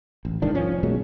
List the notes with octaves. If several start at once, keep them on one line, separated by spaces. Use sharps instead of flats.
A1
C2 G#2 D#3 D4
F3 C#4
F1
B2 F#3 G#3 A#3